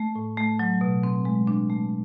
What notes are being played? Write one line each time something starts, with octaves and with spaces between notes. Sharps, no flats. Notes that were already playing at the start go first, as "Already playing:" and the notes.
Already playing: A3
A2
A3
F#3
B2
C4
G#3
D4
A3